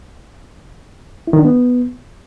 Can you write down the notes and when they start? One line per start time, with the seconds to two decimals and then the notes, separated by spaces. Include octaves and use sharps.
1.27 E4
1.33 D#3
1.39 D4
1.45 B3